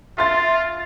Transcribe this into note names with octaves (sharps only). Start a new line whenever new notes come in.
F4 E5 C6 A6